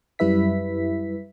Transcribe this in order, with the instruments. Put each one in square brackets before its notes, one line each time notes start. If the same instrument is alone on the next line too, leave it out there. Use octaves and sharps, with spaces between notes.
[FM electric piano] F#2 G3 E4 B4 E5 B6